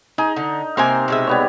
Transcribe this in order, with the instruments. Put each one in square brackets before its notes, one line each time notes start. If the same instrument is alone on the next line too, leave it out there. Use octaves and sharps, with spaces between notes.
[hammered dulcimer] D#4 [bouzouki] G#4
[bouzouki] D3
[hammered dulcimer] C3 C6 [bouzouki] A#3 A#4 G#5
[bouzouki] B2 G#3 E5
[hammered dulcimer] G3 B3 C#5